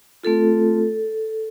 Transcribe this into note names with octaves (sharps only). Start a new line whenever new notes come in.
A3 C4 F4 A4